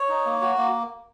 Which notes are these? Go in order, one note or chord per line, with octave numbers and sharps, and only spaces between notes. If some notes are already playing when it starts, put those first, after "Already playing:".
Already playing: C#5
D#4
A#3
F#4
A#3